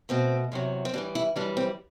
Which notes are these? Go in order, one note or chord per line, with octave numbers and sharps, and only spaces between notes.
B2 A3 C4
E2 C3 F#3
C4
A2 E3 G3 D4
E4
F#2 E3 G3 D4
C4